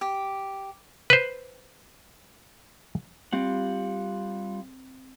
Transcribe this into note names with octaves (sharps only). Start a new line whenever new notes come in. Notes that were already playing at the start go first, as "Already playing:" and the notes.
G4
B4 C5
G3 C4 F4 F#5